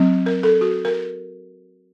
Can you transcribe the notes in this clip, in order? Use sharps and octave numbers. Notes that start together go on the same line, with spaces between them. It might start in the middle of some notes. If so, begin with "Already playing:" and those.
Already playing: F#3 C4
A#4
A4
F#4
A#4